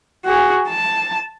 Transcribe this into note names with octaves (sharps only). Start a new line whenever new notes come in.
F#4 G#4
A5